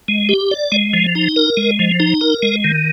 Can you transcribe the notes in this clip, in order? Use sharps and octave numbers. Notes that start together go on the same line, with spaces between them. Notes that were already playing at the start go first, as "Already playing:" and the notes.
G#3
G4
D5
G#3
F3
D#4
A#4
G#3
F3
D#4
A#4
G#3
D#3